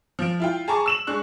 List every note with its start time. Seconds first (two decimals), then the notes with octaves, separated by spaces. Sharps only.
0.19 F3 D7
0.40 E4 F4 G5
0.68 G#4 A5 A#5 C#6 D6
0.86 E6 E7 F#7
1.07 G#3 D4 C#6 F#6